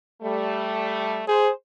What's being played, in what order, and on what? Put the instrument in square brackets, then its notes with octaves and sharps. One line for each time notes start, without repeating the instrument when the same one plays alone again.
[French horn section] G3 A3
[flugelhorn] G#4 [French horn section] C5